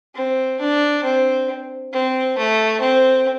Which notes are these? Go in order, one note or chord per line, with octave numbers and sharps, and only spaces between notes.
C4
D4
C4
C4
A3
C4